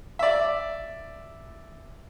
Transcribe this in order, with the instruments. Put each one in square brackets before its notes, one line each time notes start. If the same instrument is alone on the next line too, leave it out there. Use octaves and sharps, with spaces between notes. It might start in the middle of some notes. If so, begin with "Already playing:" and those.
[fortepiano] D5 E5